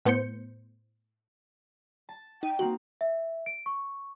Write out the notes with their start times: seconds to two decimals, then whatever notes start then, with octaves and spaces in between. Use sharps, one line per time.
0.05 A2 B3 C5 G6 C#7
2.09 A5
2.43 D#4 G5
2.59 A#3 C4 D#4 F#4
3.01 E5
3.46 D7
3.66 C#6